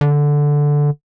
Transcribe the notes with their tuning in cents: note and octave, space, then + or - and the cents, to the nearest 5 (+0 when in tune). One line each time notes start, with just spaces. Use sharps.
D3 -5